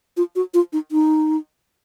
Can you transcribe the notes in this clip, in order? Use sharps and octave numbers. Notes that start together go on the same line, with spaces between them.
F4
F#4
F4
D#4
D#4